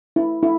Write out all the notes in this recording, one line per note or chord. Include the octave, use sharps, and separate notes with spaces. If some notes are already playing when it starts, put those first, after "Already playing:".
E4
E4